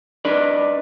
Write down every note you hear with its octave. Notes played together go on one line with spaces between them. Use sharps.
D4 D#4 B4 D5